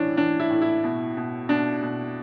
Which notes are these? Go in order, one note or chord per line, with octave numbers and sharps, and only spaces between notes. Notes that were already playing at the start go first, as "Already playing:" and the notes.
Already playing: A2 E3 C#4 D4
E3 D4
E4
A2
E4
B2
B2
B2 D4
B2